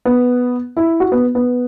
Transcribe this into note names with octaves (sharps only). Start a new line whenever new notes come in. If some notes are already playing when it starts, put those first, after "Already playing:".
B3
E4
F#4
B3
B3